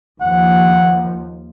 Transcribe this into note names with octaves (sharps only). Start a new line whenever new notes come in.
D#2 F3 F#5